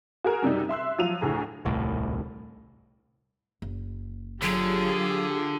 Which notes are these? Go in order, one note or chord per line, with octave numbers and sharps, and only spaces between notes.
F#4 G#4 A#4
F#2 C3 G3 D#4
E5 C6 E6 F#6
F3 F#3 F5 D#7 F7
D2 A2 G#4 A#5
D#1 C2 A2
F#1
D3 F#3 F4 G4 G#4